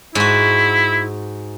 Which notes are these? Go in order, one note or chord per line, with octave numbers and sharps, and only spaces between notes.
G#2 E4 F#4